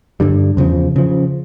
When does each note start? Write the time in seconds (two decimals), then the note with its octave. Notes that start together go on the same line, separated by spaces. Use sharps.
0.20 G2 D3 G3
0.57 E2 C#3 F3
0.96 C#3 F3